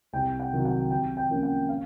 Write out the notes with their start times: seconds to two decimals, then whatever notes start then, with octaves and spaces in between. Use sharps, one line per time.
0.13 C2 G5
0.40 F#5
0.52 C3 D#3 F#3
0.65 F#5
0.91 C3 G5
1.17 G5
1.30 F3 A#3 C#4
1.43 F#5
1.69 F5